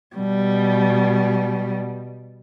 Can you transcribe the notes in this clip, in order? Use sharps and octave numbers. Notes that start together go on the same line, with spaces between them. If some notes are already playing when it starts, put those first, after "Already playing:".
B2 G3